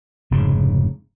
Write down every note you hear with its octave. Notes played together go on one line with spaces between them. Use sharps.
F1 G#2 C#3